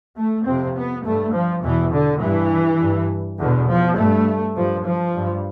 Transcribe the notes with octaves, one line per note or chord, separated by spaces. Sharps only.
A3
F2 C3 C4
B3
G2 A3
F3
E2 B2 E3
D3
G2 E3
G2
E2 B2 D3
F3
G2 A3
G2 F3
F3
G2